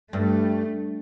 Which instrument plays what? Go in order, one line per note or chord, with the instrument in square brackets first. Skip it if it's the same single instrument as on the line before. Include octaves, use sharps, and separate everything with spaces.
[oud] G2 [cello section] A3